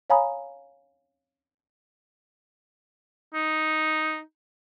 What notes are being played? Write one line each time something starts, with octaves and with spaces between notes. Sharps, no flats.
C#5 F5 G#5 A#5 B5 D#6
D#4